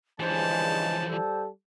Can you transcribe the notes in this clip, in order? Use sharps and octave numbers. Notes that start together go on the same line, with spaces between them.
G2 C#3 E3 F3 G#3 C5 A5
G3 A4